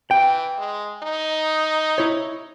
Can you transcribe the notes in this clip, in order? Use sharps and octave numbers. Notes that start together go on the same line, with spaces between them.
E3 G5
G#3
D#4
E4 C#5